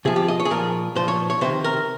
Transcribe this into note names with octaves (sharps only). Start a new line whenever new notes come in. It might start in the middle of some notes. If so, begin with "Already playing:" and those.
C3 F3 G#4
G4
D#5
C#5
G#4
A#2 F3 A#4
A#2 F3 C5
C#5
C#5
C3 D#3 C5
A#4